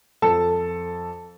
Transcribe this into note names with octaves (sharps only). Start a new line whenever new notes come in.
F2 A4 A5